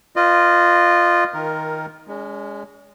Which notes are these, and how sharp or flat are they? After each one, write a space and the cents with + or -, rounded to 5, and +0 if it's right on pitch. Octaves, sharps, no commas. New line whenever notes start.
F4 +0 B4 +35 D#5 -30
D#3 +15 A#4 +0
G#3 -15 C#4 +40